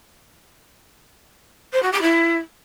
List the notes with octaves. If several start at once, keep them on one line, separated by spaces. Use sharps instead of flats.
C5
F#4
G4
E4